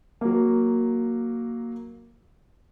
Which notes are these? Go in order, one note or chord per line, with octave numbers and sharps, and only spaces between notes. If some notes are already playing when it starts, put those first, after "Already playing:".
F#3 A#3